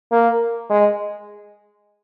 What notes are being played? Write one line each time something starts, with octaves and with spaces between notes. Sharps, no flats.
A#3
G#3